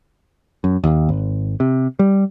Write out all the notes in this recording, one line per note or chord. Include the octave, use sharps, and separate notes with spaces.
F#2
D#2
G#1
C3
G3